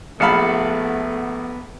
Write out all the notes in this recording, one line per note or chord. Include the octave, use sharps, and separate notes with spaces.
A#1 A3 B3 F5 F#5 A5 B5